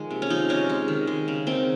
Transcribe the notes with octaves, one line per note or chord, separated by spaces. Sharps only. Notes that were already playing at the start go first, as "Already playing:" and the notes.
Already playing: D#3 F3 G#3
C3
C#4
F3 D#4
C3 C#4
G#3
D#3
G#3
C#3
D#3 C4